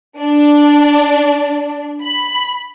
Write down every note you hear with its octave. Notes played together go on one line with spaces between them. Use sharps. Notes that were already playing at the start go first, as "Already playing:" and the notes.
D4
B5